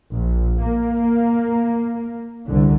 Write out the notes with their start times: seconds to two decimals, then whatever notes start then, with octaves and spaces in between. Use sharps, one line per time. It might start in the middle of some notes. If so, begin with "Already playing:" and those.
0.13 A#1
0.62 A#3
2.48 C2 D3